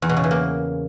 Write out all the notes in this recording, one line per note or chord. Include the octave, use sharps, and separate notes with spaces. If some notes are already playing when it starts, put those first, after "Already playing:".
E2
B2
C#3
E3
A#3